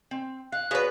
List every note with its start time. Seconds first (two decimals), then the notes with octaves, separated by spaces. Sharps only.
0.11 C4
0.52 F5 F#6
0.71 B3 F#4 G#4 B4 C#5 D5 F5